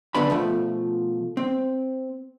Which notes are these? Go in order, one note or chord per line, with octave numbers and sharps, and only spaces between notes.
F#2 D3 B3 D4 B5
B2 F3 A3
C4